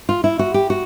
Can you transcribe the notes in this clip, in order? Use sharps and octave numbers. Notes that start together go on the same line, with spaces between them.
F4
E4
F#4
G4
F#4